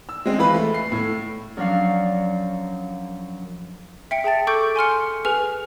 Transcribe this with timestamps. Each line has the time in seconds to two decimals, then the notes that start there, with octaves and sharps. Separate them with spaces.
0.09 E6
0.26 G#3 C4
0.39 E3 F4 B4 B5
0.54 A3
0.74 C7
0.92 A2
1.57 F#2 F3 F#3 D4 F5
4.11 E5 G5 C#7 D7
4.24 G#4 G5 A5 A6
4.47 A4 C#6 D6 G6 D7
4.76 G#5 C6 F6 C#7
5.25 G#4 B4 G#5 F6 F7